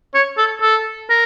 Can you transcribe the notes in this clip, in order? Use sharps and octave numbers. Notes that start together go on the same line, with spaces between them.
C#5
A4
A4
A#4